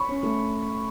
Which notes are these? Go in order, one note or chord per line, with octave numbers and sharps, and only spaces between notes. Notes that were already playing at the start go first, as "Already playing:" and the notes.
Already playing: B5 C#6
C#4
A3